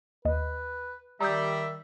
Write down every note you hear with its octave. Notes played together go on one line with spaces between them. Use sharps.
D#2 B4 D#5
D#3 G3 E5 A#5 D#6 G6